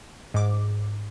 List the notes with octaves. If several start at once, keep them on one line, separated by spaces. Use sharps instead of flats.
G#2 D6